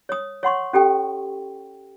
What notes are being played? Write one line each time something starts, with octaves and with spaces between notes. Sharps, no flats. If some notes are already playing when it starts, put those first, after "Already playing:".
C#5 D#6
C#5 F#5 C6 C#6
C#4 G4 A4 G5